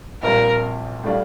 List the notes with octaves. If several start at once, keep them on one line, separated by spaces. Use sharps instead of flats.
A#1 A#2 G3 C4 F4 A#4
A2 G3 D4 F4